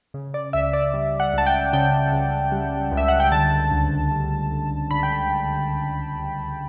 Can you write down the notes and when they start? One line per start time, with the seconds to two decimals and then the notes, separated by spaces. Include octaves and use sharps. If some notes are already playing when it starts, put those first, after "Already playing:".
0.14 C#3
0.34 D5
0.53 C#2 E5
0.73 D5
0.94 G3
1.20 F#5
1.33 C#2 A5
1.46 G5
1.73 C#3 G5
2.12 C#2
2.52 G3
2.92 C#2
2.97 E5
3.08 F#5
3.20 G5
3.32 D3 A5
3.71 D2
4.11 G3
4.52 D2
4.91 D3 B5
5.03 G5